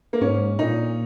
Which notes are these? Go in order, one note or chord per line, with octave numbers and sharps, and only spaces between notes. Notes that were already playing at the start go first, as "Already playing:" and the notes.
A#3
G#2 C#4
A#2 D#4